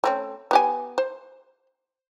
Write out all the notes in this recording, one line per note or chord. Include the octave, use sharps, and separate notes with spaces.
A3 C4 C#4
B3 G4 G#5
C5